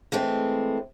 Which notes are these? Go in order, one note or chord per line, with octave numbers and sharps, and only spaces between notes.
E3 G#3 A3 C4